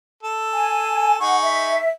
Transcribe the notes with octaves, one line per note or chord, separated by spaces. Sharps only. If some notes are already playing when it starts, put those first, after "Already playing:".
A4
G#5
D#4 G#4 F#5 C#6
E5